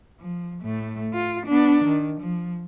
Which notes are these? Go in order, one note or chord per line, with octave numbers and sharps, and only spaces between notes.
F3
A2 A3
F4
B3 D4
D#3
F3